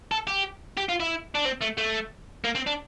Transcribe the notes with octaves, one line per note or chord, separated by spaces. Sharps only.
A4
G4
G4
F4
E4
D4
C4
A3
A3
A#3
C4
D4